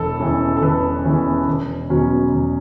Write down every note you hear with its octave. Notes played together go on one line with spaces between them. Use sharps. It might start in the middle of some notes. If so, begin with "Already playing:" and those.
Already playing: E1 A4
E2 E3 C#4
A4
E1 B4
E2 E3 C#4
E1
E2 B2 F#3 C#4
E1